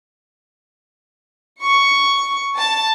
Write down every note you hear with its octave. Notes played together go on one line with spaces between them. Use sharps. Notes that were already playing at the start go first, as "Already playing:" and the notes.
C#6
A5